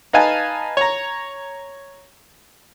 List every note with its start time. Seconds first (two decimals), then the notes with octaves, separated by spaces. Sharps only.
0.13 D#4 B4 F5 G#5 A5
0.77 C#5 A#5